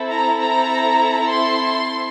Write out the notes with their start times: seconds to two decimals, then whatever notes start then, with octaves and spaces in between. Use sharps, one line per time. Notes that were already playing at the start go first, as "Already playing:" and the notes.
Already playing: C4 E4 A4
0.09 A#5
0.40 A#5
1.31 C6